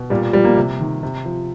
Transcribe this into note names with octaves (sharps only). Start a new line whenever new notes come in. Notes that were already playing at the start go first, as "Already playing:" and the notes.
Already playing: B2
A#2 G3
F3 G3
A#3
C3
D#3
C3
F3